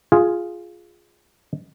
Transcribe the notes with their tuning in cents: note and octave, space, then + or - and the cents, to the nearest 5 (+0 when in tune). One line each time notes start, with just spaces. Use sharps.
F4 +0 G#4 +0